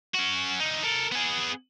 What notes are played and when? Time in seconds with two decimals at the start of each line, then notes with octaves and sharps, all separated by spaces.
0.14 C#4 F#4
0.60 D3 D#4
0.83 A4 A#4
1.12 B3 G#4